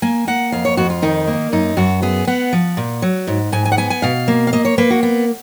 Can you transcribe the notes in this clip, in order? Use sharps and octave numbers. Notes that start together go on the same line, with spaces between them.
A#3 G#5
A#3 F#5
F2 F5
C#5
F2 F#4
F4
D#3 D#4
A#3
F#2 D#4
F#2 F#4
B3 G#4
B3 F#5
F3
A#2
F#3
G#2
G#2 G#5
G#5
F#5
B3 G#5
G#5
B2 F5
A#3
F5
A#3 D#5
C#5
A#3 B4
F#4
B3